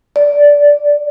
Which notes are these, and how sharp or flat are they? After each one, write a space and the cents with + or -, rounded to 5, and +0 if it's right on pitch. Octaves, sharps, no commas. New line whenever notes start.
D5 -15